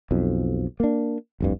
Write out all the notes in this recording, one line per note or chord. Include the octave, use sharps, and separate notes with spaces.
B1 F2
A#3 D4
F1 C2 G2